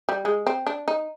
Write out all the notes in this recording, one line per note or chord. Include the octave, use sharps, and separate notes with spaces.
G3
G#3
C4
D4
D#4